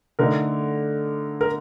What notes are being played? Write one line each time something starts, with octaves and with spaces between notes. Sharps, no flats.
D3 A3 D#4 A#4
A#4